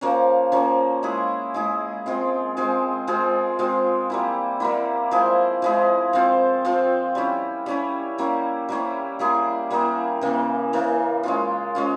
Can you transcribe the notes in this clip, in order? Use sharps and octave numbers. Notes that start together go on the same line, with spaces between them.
F3 A#3 C#4
F3 A#3 C#4
G#3 E4 G#4
G#3 E4 G#4
G#3 C4 F4 G#4
G#3 C4 F4 G#4
G#3 C4 F4 G#4
G#3 C4 F4 G#4
G3 A#3 E4
G3 A#3 E4
F3 G#3 E4 G#4
F3 G#3 E4 G#4
F3 C4 F4
F3 C4 F4
G3 C#4 E4
G3 C#4 E4
G3 A#3 C#4 E4
G3 A#3 C#4 E4
G3 A#3 E4 G#4
G3 A#3 E4 G#4
C#3 E3 A#3
C#3 E3 A#3
G#3 C#4 F4
G#3 C#4 F4